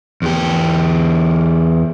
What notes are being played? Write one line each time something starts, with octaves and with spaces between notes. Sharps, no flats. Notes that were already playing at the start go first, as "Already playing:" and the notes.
E2 G4